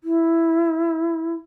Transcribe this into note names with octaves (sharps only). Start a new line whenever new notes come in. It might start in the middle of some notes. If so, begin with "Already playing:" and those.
E4